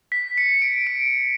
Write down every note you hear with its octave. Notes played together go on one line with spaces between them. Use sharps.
B6
C#7
D7
D7